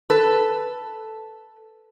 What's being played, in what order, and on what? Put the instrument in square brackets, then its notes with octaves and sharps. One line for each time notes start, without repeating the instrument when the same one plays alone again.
[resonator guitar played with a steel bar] A4 B4